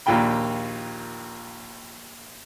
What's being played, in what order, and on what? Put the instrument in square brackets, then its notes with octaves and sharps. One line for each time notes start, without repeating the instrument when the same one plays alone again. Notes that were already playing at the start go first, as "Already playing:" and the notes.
[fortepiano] A#1 D#2 A#2 F4 G5 B5